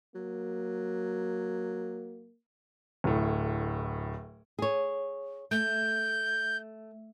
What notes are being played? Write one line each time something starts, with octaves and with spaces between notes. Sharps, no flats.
F#3 A#3
D1 A2
G#4 C#5
A3 G6